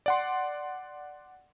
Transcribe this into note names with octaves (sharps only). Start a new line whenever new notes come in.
D5 F#5 C6